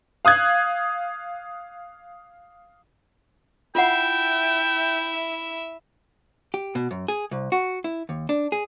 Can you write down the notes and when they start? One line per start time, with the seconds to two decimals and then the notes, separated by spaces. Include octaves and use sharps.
0.25 F5 D#6 F#6 G#6
3.75 E4 F4 E5 F#5 G5
6.54 G4
6.75 B2
6.91 F#2
7.08 G#4
7.31 C2
7.52 F#4
7.84 E4
8.09 D#2
8.29 D4
8.52 G#4